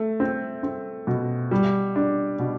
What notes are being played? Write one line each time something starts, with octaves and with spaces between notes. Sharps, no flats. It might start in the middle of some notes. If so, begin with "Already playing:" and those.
Already playing: A3
C4
C4
B2
G3
D4
B2